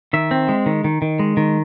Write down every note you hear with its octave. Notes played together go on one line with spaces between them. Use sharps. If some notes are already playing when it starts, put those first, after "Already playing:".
D#3 E5
C4
G#3
D#3
D#3
D#3
G#3
D#3